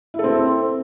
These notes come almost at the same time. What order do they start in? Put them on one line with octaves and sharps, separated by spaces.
E4 A4 C4